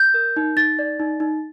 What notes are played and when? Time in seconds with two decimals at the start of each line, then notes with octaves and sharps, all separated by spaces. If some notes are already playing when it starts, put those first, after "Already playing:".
Already playing: G6
0.14 A#4
0.37 D#4
0.57 D#4 A6
0.79 D5
1.00 D#4
1.20 D#4